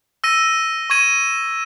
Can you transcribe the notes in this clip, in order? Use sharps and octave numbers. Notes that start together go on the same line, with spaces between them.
E6 A#6 D#7
C#6 G#6 D#7 F#7